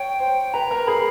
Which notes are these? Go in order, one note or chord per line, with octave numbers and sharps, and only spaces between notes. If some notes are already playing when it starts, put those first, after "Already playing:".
Already playing: C#5 G5
C5
B4 A#5
A#4
G#4 B5